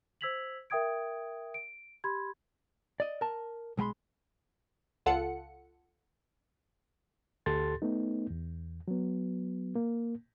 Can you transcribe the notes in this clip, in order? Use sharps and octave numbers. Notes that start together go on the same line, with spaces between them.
C5 E6 G#6 B6 F7 F#7
A#4 E5 G5 D#6 G#6 D7
D7
G4 B5 C6 G#6
D5 D#5
A#4 A5
B1 G#3 G5 B5 C6
C#2 F4 A4 F#5 C#7
D2 G4 A4 C6 A6
A3 B3 D#4
E2
F#3 B3
A#3